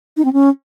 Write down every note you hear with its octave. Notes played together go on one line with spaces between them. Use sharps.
D#4
C4
C#4